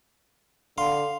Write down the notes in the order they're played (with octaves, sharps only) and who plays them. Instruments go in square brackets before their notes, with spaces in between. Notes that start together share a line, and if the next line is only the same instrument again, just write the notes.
[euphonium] D3 [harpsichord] F5 [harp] C6